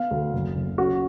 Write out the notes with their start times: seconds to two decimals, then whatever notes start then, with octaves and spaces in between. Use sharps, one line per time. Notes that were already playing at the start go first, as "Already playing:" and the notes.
Already playing: B3 F5
0.11 D2
0.33 F#1
0.55 F#1
0.78 C#4 F#4